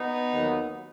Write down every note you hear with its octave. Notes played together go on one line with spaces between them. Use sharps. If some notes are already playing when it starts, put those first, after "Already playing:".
Already playing: B3 D#4
D#2 D#3 F#3